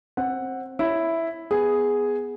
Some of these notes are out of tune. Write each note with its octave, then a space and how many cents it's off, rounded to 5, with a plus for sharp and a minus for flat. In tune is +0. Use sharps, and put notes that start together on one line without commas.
C4 +20 C5 +25 F#5 +0
E4 +0 C#5 +0
B3 +5 G#4 +0